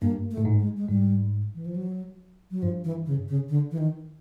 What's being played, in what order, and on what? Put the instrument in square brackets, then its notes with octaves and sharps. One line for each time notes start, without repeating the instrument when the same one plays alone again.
[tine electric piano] G2 [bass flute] A#3
[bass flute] A3
[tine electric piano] A2
G#2
[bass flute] G#3
G#3
[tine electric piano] G#2 [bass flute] G3
[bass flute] E3
F3
F#3
F#3
[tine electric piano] G2 [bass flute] F3
[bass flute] E3
C#3
C#3
D3
E3
D#3